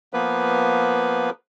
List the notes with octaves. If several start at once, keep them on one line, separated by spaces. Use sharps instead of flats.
F3 A#3 B3 B4